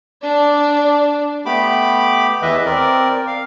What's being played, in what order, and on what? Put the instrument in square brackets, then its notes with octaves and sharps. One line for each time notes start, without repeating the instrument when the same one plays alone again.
[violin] D4 D5
[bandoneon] A3 B3 G4 B5 D6
E2 E3 B4 D#5 E5
C4 A#4 D5
F5